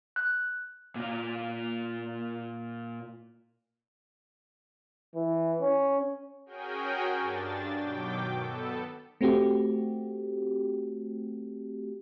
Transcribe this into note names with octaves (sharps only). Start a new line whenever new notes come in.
F#6
A#2 F4
E3
C#4
C#4 F#4 G#4 A#4 G5 G#5
G2 D4 A6
B2 D#3 F#3 G5 D6
B3 A4
A3 C4 F#4 G4